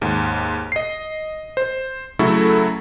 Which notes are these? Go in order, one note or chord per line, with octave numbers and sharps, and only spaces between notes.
D#2 G#2
D#5 C7
C5
C#3 F#3 A3 E4 F#4 A4